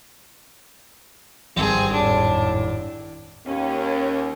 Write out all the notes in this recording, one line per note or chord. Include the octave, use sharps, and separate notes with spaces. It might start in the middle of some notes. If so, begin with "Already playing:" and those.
G#1 G2 C4 G#4
F2 A2 D4
D#2 C#4